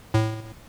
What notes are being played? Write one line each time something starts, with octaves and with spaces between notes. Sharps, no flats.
A2